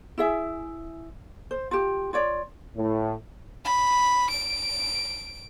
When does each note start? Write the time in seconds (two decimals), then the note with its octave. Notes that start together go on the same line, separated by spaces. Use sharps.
0.18 E4 G#4 E5
1.51 C5
1.71 F4 G4
2.13 F4 C#5 D5
2.77 A2
3.65 B5
4.30 D7